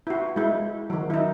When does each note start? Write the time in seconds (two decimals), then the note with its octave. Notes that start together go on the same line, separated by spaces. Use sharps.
0.07 E4 F#4
0.36 G#3 E4
0.90 D#3 F#3
1.10 D#4 E4